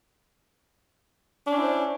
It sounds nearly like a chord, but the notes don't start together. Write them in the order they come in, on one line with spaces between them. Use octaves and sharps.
D4 C#4 E4 C5